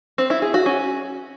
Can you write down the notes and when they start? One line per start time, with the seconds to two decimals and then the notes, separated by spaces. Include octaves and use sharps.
0.18 C4
0.30 E4
0.42 G#4
0.54 F#4
0.66 C#4